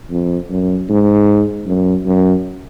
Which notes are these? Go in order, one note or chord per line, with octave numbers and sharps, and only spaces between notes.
F2
F#2
G#2
F#2
F#2